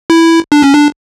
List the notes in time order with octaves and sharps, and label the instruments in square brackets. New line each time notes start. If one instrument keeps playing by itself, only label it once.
[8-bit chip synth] E4
D4
C#4
D4